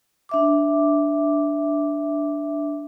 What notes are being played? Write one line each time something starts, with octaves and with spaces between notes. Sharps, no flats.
D4 E5 D6